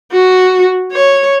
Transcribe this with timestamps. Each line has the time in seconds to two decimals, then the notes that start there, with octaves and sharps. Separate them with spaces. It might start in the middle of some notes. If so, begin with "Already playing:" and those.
0.13 F#4
0.93 C#5